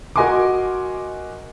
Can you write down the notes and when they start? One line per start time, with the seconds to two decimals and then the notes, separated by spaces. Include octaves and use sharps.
0.16 F#4 A#4 D#5 G#5 C6 D6